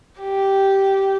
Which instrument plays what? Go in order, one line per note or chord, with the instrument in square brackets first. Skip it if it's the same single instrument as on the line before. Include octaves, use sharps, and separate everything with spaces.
[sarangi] G4